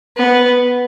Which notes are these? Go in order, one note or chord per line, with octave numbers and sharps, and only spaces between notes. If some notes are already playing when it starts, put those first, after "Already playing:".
B3